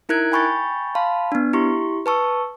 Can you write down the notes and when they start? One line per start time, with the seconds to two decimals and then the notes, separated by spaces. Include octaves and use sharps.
0.09 D#4 E4 A#4 F#6 G#6 D7
0.32 G5 G#5 B5 C#6 G6 A6
0.95 F5 A5 B5 C6
1.32 B3 D4
1.53 E4 G4 C6 C#6
2.06 B4 A5 C#6 E6